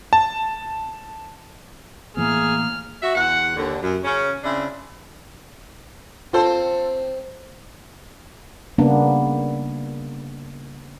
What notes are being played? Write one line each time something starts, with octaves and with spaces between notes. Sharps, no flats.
A5
A2 E3 A#3 B3 G#4 F6
F#4 E5
E2 F#5
D#2 D3
F#2
C#3 C#4
C#3 C4 D4 E4
C4 F4 A4 C5
C#3 G3 A#3 B3 D4